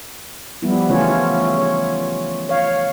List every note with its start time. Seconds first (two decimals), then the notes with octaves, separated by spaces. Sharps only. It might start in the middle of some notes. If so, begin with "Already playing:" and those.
0.62 F3 G3 B3 E4
0.89 C#3 E3 A3 C#4 F4 C#5
1.59 C#5
2.49 C#5 F5